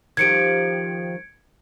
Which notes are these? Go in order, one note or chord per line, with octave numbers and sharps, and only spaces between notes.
D#3 F3 G4 G#6 C#7 D7